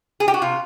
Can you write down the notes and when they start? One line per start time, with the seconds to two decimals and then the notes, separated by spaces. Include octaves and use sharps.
0.20 G#4
0.28 G4
0.34 F#4
0.42 C3 F4